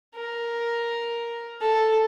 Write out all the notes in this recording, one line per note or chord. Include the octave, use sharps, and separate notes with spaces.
A#4
A4